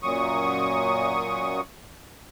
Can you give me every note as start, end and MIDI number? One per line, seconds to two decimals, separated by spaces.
0.03 1.61 42
0.03 1.61 46
0.03 1.61 54
0.03 1.61 85
0.03 1.61 87